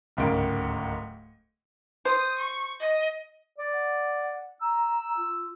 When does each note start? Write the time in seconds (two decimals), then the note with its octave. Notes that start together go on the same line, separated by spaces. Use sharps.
0.17 D1 C#2 G#2 A#3 D7
2.05 C5 D#6
2.39 C#6
2.79 D#5
3.58 D5
3.74 F#5
4.62 A#5 E6
5.17 F4